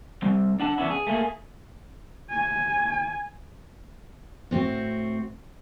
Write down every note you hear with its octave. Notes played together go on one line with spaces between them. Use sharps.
G3 C4
D4 F#5 A5
E2 B3 C#4 D4 E4
G#4
A3 A#3 F4 G#4
G#5
A2 C4 F#4